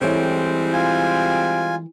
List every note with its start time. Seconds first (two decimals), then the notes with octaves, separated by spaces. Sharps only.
0.02 E3 G3 G#3 C4 A4 C#5
0.73 F4 G#5